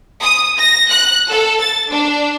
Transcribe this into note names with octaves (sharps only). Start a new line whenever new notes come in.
D#6
A#6
F#6
A4
A6
D4